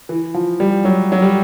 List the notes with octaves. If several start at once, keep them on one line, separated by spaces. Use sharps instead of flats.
E3
F3
G3
F#3
F#3
G3